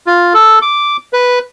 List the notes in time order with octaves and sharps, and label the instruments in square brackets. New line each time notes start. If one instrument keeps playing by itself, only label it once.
[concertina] F4
A4
D6
B4